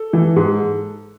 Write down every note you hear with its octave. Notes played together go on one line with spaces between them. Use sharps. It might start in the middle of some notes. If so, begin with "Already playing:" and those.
Already playing: A4
E3
G#2